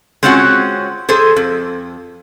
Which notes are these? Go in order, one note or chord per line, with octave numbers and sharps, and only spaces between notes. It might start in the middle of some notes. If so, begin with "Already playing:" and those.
G#3 C4 C#4 F4 F#4 F#5
G#4 A4 C5
F2